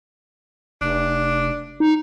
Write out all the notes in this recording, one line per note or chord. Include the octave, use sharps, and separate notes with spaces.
F1 D4
D#4